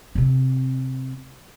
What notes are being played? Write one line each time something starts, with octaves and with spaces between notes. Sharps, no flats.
C3 C4